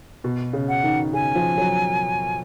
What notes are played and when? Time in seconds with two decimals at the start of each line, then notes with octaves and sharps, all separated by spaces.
0.24 B2
0.53 C#3
0.68 F#5
0.84 D#3
1.13 C#3 G#5
1.35 F3
1.58 F#3